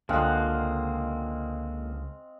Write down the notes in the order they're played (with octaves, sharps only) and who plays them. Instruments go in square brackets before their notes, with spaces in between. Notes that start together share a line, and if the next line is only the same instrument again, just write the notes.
[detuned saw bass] C#2 [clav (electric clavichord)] D3 F3 [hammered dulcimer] G#3 C4 F5 [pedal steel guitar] A#3 F#5